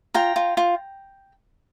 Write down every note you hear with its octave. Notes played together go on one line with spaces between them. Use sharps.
F4 G5 A#5
F4
F4